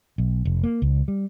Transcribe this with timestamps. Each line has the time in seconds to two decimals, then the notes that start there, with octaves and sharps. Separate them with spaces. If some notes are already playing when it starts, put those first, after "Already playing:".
0.18 B1
0.45 F1
0.64 A#3
0.82 C#2
1.08 G3